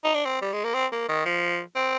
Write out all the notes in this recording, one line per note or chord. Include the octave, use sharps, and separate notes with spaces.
D#4
D4
C4
G3
G#3
A#3
C4
A#3
D#3
F3
C4